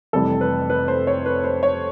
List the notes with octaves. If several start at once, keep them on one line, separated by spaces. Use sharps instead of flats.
F1 F2 C3 E3 G3 A4
B4
B4
C5
C#5
B4
C5
C#5